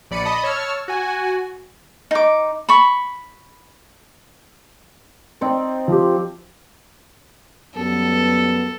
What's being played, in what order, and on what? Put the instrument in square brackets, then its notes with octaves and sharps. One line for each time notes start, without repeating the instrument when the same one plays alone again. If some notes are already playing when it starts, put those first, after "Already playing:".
[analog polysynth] A#1 D5 B5 C#7 D#7
D#5 A5 B5 D#6
C#5 A5 C#6 E6 F6
F#4 G#5
[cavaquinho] D#4 D6
B5 C#6
[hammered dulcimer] C4 D#4 D5
[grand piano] F3 G4
[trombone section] F#2 G3 B3 [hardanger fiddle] A4